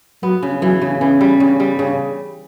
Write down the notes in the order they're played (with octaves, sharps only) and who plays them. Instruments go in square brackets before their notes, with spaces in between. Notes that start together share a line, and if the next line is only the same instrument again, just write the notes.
[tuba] F#3 [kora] B3
[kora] C#3
[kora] E3 [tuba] F#3
[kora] C#3
[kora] E3 [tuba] C#4
[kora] G3
C#3
G3
C#3